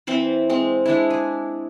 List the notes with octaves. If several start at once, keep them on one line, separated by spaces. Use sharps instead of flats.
E3 C4 C5 B5
G#3 C4
G#3 D4 E4
G#4